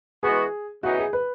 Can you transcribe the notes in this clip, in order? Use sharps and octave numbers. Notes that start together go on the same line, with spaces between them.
E3 G#3 B3 F#4 G#4
C#3 E3 B3 D#4 F#4
G#4
B4